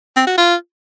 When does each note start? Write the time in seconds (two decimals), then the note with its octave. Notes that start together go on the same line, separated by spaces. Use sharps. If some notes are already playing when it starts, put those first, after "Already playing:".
0.16 C4
0.27 F#4
0.38 F4